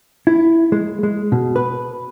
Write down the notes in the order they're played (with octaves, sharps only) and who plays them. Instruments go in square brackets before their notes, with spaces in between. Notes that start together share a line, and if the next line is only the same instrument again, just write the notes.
[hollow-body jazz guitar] E4
G#3
G#3
B2
B4